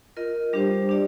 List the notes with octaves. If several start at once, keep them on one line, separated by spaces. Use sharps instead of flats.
F4 A#4 D#5
G3 D4 G4 C5
D4 G4 D5